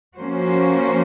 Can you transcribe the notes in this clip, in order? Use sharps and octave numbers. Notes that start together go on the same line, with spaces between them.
F3 A#3 C#4 F#4 C5